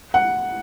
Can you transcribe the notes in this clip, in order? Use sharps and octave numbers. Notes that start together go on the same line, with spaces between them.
F#5